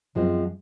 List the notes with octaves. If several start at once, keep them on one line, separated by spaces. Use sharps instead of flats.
F#2 F3 G#3 C4